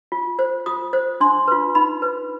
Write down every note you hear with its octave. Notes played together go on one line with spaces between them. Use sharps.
F4
C5
F4 D#6
C5
D4 C6
F4 B4
D#4 B5
B4